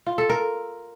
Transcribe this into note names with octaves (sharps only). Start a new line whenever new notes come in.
F4
A4
A#4